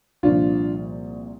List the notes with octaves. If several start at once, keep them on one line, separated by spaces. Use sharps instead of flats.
C2 A#2 F3 D4 F4